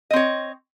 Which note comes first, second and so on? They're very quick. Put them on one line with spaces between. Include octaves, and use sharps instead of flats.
D#5 C4 C#5